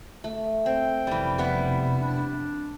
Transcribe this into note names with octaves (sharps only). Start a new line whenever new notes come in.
A3
C4 G5
F1 C3 E3 G3
G3 B3 E4
D4